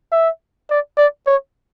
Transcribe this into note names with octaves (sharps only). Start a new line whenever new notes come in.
E5
D5
D5
C#5